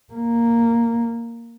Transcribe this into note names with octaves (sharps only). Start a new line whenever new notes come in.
A#3